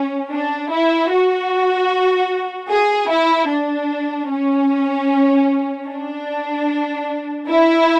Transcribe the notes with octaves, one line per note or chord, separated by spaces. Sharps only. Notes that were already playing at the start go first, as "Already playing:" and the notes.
Already playing: C#4
D4
E4
F#4
G#4
E4
D4
C#4
D4
E4